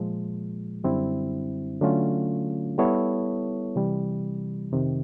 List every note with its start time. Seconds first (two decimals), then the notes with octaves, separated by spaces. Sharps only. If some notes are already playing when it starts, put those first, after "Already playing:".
Already playing: A#2 F3 G#3
0.84 F#2 D3 G3 C4 E4
1.81 D3 F#3 A3 C#4 F4
2.78 G3 B3 E4 A4 C#5
3.76 C3 E3 G3
4.72 F2 C3 D#3